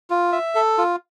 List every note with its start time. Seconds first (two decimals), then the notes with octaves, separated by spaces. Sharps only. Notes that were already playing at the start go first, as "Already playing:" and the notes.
0.10 F4
0.32 E5
0.55 A4
0.78 F4